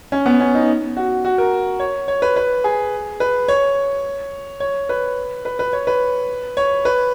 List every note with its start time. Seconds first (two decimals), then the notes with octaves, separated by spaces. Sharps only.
0.12 C#4
0.26 B3
0.40 C#4
0.55 D#4
0.97 F#4
1.25 F#4
1.38 A#4
1.80 C#5
2.08 C#5
2.22 B4
2.36 B4
2.64 G#4
3.20 B4
3.48 C#5
4.60 C#5
4.89 B4
5.45 B4
5.59 B4
5.73 C#5
5.87 B4
6.57 C#5
6.85 B4